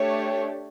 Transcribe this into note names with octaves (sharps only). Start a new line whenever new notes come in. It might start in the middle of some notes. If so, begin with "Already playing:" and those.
Already playing: A3 D4 G4 C#5